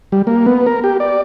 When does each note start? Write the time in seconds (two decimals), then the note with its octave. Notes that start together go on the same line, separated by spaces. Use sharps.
0.12 G3
0.27 A#3
0.46 B3
0.66 A#4
0.84 G4
1.00 D5